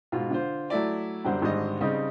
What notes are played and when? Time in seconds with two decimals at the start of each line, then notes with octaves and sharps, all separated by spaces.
0.12 G#2 B2 F4
0.30 D3 F4 C5
0.70 F#3 A3 E4 D5
1.25 F#2 D3 G3 C5 F#5
1.42 G#1 G#2 D3 G3 G#3 D#5
1.81 C#3 G3 C4 D#4